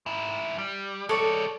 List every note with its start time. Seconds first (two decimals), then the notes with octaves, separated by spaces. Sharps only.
0.06 G#2 E4
0.58 G3
1.09 G#3 A4 C#5 D5